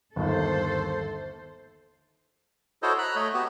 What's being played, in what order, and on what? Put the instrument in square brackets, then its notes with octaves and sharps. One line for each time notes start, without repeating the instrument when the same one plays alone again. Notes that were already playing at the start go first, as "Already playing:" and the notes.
[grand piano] G1 D#2 [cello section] A4 C5
[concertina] E4 F#4 A4 C5 C#5 D#5
A#5 B5 F#6
A3 C#5 D#5
B3 F#4 G4